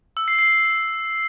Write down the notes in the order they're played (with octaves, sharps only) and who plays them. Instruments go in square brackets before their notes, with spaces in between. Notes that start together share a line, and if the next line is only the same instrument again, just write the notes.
[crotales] E6
C7
C7